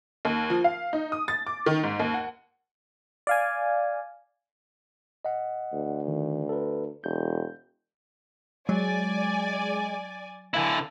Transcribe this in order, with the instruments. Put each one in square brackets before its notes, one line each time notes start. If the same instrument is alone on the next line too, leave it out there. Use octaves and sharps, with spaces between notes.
[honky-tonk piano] D#2
F3
F5
D#4
D#6
A6
D6
D#3
G#2
D#2
F#5
[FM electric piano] D5 F5 G#5
[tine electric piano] D#5 F#5
[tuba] D2
[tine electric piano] D#3
A4 B4
[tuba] E1 [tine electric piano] G6
[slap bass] F#3 [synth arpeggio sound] G#3 [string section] D5 G#5
[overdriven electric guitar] D3 E4 [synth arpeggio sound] F5 G#5